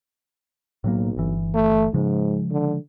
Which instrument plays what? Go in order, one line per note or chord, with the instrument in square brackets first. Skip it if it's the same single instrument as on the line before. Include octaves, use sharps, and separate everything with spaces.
[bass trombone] B1 [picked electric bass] A2 F#3 A#3
[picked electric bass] G1 E3
[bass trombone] A3
[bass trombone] G#2 [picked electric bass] C#3 F3 G#3
[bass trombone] D3